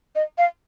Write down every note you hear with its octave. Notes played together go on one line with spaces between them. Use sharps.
D#5
F5